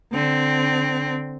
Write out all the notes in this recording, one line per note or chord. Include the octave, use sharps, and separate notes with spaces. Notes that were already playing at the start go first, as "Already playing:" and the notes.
D3 C4